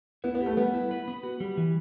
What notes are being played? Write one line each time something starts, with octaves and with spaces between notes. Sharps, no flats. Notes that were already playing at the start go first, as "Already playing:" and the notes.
B3 E4
B3
G4
A3
G3 B3
E4
B4
B3
F#4
G3
E3